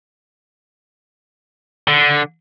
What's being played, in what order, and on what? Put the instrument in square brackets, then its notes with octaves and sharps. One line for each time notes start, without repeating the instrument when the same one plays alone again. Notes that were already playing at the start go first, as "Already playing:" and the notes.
[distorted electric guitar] D3